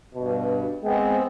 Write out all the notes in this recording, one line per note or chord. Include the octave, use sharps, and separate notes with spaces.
G2 B2
G#3 B3 C4